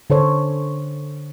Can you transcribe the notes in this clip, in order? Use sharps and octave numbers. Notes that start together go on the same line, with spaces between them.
D3 A4 C5 C#5